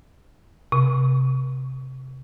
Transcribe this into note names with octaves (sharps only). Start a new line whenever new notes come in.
C3